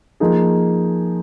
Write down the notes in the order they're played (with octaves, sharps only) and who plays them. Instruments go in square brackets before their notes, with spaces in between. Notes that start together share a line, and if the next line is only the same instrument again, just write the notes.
[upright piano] F3 A#3 D#4 G#4